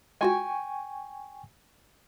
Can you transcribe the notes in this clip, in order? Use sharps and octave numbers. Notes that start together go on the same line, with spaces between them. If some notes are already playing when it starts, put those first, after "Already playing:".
G#3 F4 F#4 G5 G#5 C#6